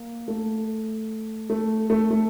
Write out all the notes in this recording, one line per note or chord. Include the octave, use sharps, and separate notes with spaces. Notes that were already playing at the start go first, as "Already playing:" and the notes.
Already playing: A#3
A3
A3
A3
A3